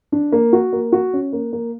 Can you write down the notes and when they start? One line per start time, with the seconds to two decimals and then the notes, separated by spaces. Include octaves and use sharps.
0.12 D4
0.32 A#3
0.53 F#4
0.73 A#3
0.92 F#4
1.13 C#4
1.33 A#3
1.53 A#3